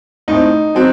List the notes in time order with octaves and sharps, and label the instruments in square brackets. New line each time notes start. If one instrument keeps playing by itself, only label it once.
[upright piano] A2 A3 C4 [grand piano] D#4
[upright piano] F#3 C4 F#4